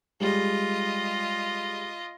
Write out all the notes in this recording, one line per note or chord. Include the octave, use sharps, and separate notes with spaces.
G3 G#3 F4 D#5